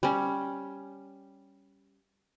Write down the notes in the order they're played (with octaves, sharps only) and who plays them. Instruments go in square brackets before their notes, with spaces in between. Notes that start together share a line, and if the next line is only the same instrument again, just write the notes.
[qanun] G3 C#4